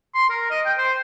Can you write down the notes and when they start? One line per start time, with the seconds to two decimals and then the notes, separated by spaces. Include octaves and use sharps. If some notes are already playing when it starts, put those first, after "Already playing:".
0.14 C6
0.30 A#4
0.50 D#5
0.65 G5
0.78 C5